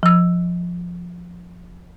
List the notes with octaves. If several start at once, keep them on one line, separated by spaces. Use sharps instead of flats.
F3 E6